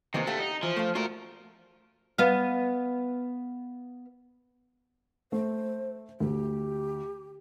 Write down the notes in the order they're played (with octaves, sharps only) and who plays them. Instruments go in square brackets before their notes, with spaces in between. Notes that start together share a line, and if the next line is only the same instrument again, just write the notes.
[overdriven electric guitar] C3 [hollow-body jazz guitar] D#3 E3 A#3
[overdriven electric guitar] D2 A3 [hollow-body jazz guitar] G4 F5 F#5
[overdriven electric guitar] D#4
[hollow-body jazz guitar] E3 [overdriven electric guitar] F3
[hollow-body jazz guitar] A3 F5
[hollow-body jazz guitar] A3 F#4 [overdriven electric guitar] F4 A#4
[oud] B3 F5
[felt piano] A3 [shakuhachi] C5
[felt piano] D2 [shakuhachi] G4